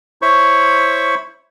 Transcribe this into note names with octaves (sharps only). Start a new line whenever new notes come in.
E4 C5 C#5 B5 C#6